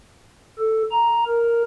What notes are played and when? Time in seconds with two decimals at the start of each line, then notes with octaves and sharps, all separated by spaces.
0.59 A4
0.91 A#5
1.27 A#4